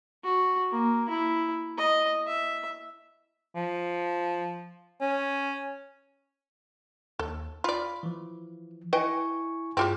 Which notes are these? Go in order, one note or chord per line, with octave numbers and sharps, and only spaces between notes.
F#4
A#3
E4
D#5
E5
F3
C#4
D#2 A4
F4 D5 B5
E3 F3
E4 B4 D#5 G5 G#5 C#6
G2 C4 F4 G4 G#4 D6